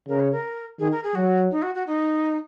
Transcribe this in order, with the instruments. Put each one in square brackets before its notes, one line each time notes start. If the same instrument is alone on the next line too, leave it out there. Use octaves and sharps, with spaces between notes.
[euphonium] C#3 [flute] A#4
[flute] C#5
A#4
[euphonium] D#3 [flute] G#4
[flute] A#4
G#4
[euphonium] F#3 [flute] F#4
[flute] D#4
F#4
F#4
D#4